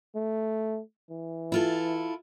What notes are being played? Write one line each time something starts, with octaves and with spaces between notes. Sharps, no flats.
A3
E3
E4 F4 A4